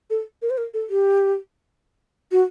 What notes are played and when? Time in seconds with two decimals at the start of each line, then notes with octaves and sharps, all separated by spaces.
0.10 A4
0.42 A#4
0.50 C5
0.58 A#4
0.74 A4
0.90 G4
2.32 F#4